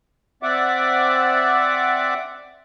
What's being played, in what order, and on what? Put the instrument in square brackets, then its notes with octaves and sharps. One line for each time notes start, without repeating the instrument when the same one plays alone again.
[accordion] C4 D5 E5 F#5 D6